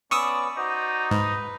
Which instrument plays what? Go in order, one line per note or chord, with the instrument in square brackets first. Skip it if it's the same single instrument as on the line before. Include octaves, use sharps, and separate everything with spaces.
[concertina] B3 C#4 B4 [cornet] D5 [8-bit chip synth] C#6 D#6 E6
[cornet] D#4 [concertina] F#4 C5 D5
[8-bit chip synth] G#2 [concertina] B4